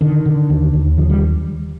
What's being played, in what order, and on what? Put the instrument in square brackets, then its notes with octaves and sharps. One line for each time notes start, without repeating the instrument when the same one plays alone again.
[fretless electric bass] D3 D#3
D3
D#2
D#2
D3 F3
G3